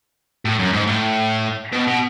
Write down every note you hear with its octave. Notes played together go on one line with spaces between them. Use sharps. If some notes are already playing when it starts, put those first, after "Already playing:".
A2
F#2
G#2
A2
B2
B2